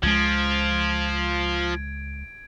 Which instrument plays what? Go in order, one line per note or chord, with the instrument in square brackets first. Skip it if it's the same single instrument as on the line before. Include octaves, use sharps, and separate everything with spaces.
[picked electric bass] C#2 G#3 [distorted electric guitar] F3 [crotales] G#6 D7